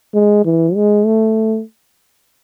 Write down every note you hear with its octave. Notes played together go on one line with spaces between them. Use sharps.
G#3
E3
G#3
A3